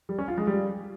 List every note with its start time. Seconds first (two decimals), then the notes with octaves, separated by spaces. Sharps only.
0.09 G3
0.18 C#4
0.28 F4
0.38 G#3
0.47 G3